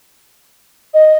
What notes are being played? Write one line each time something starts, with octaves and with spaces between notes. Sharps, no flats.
D#5